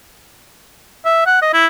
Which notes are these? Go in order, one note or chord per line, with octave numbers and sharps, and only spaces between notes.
E5
F#5
D#5
E4